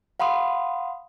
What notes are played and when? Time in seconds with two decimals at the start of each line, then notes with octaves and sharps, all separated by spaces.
0.20 F5 F#5 B5 C6 D#6